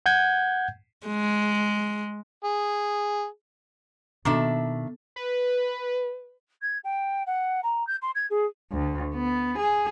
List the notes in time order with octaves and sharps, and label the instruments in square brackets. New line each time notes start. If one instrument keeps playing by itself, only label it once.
[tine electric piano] F#5 G6 G#6
[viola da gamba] G#3
[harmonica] G#4
[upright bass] B2 A#3 [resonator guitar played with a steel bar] D#3 D4 E5 [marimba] B3 A4 A5
[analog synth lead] B4
[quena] G#6
G5
F#5
A#5
G6
C6
G#6
G#4
[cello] D2
B3
G#4